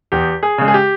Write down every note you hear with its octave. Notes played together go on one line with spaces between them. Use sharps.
E2 G4
G#4
C#3 G#3
G#4
G4